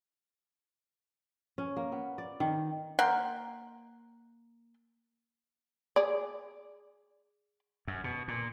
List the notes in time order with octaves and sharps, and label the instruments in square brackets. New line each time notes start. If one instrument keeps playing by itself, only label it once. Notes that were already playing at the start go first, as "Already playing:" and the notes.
[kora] C#4
A#3
B3
D5
D#3
[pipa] A#3 F#5 G5 C6
[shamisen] G#4 D5
[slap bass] F#2
B2
A#2